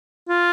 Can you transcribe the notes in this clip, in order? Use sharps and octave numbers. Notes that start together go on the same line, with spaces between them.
F4